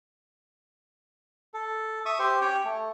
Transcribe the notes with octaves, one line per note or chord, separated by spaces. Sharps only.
A4
E5 C#6 D#6
G4 C5
C#4 G4 C#5 G5
A3